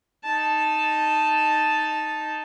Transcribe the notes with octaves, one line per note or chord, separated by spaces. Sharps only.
D#4 A5